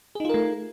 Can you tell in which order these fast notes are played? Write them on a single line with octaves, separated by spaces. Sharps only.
G#4 D#4 F4 A#4 A3